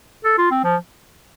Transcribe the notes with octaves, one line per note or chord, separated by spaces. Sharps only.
A4
F4
C4
F3